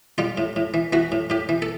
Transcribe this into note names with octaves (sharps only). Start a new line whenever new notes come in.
G3 F4
A2
A2
E3
E3 F#4
A2
A2 G4
E3
A4